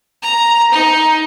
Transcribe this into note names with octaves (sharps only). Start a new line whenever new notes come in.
A#5
D#4